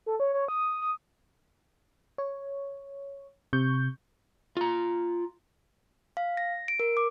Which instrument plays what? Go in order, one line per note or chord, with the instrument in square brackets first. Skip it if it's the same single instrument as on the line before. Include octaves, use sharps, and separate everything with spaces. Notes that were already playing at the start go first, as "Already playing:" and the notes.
[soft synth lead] A4
C#5
C#5
D#6
D#6
[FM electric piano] C#5
C3 C#6 G6
[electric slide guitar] F4 A#5
[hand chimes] F5
A#6
D7
A#4
D6